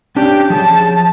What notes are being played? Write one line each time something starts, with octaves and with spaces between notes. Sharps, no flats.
C#4 D4 G4 A5
F3 G#4 C#5 A5